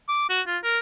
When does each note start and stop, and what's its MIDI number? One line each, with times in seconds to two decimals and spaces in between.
0.09 0.28 86
0.30 0.41 66
0.47 0.58 65
0.64 0.79 70